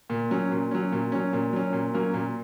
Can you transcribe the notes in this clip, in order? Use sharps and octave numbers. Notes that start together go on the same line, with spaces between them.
A#2
F#3 C#4
A#2
F#3 C#4
A#2
F#3 C#4
A#2
F#3 C#4
A#2
F#3 A#3 C#4
A#2